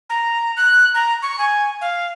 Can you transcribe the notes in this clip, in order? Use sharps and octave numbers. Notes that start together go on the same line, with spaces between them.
A#5
F#6
A#5
C#6
G#5
F5